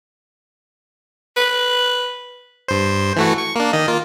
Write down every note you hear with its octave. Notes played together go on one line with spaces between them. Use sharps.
B4
G2 C5
E3 A3 F#4
C#6
A#3 D4
D#3 D#5
A#3 F4